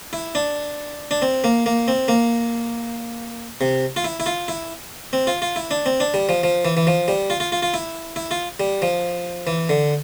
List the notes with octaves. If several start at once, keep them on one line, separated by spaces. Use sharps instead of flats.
E4
D4
D4
C4
A#3
A#3
C4
A#3
C3
F4
E4
E4
F4
E4
C4
F4
F4
E4
D4
C4
D4
G3
F3
F3
E3
E3
F3
G3
F4
F4
F4
F4
E4
E4
F4
G3
F3
E3
D3